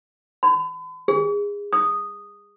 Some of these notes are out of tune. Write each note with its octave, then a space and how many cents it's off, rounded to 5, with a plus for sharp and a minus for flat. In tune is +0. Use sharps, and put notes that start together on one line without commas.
B5 +40
G#4 -25
D#6 -5